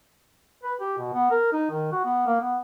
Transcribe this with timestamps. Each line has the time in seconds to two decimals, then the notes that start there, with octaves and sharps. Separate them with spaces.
0.63 B4
0.80 G4
0.98 B2
1.14 B3
1.31 A#4
1.52 D#4
1.71 D#3
1.92 F#4
2.05 B3
2.27 A#3
2.41 B3